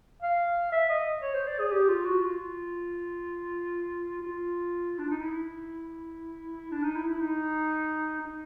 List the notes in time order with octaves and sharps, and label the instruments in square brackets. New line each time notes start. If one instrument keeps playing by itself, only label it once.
[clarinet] F5
E5
D#5
C#5
C5
D5
G#4
G4
F4
F#4
F4
F4
D4
D#4
E4
D4
D#4
E4
E4
D#4
D#4